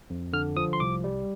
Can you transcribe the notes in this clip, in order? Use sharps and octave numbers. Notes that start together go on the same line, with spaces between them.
F2
D3 F6
F3 D#6
C6
C2 D6
G3